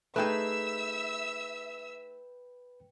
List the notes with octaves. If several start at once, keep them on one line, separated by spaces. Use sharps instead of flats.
A3 D#4 G#4 B4 E5 G5 E6